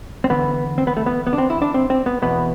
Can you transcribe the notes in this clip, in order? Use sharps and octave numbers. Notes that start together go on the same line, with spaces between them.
C4
E2 D3 B3
C4
B3
A3
B3
B3
D4
C4
E4
D4
C4
C4
B3
E2 B2 B3